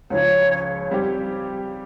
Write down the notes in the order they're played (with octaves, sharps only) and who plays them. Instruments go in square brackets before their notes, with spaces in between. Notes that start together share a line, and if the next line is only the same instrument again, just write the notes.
[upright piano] C#2 C#3 F3 [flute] C#5
[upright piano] G3 C4 G4